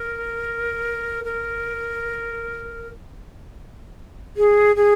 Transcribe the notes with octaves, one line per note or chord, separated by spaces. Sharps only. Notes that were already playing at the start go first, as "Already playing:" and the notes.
Already playing: A#4
A#4
G#4
G#4